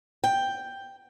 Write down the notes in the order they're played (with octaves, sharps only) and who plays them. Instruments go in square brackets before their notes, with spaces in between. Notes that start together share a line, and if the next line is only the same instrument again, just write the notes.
[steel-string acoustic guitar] G5